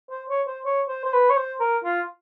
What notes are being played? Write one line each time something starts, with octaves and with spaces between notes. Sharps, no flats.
C5
C#5
C5
C#5
C5
C5
B4
C#5
C5
A#4
F4